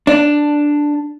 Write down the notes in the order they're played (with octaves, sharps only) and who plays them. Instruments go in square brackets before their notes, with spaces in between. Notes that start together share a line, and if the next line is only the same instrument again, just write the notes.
[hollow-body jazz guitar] D4